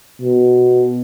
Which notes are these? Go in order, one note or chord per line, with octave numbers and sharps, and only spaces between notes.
B2